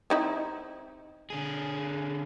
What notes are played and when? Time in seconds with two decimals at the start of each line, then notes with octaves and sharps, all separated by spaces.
0.10 C4 D#4 E4
1.30 D3 G#4